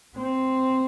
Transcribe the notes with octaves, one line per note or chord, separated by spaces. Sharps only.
C4